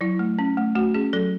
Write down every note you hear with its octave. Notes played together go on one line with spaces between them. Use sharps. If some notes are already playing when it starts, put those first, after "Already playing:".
F#3 E4
A3
C#4
A3
A3 F#4
C#4 G#4
F#3 A4